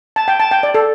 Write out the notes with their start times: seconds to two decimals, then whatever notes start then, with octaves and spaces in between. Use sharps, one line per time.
0.16 A5
0.28 G5
0.40 A5
0.51 G5
0.63 D5
0.75 A4